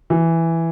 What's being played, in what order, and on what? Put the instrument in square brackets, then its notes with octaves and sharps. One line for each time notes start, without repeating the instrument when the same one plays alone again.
[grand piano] E3